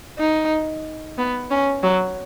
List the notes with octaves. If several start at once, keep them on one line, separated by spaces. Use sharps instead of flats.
D#4
B3
C#4
F#3